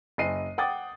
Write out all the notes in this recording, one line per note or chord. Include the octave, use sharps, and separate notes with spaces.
F#1 D#5 C7 D#7
F#5 G5 D6 D#6 A6